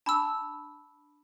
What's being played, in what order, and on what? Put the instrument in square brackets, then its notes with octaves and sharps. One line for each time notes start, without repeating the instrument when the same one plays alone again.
[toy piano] D4 B5 D6 [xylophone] A5 E6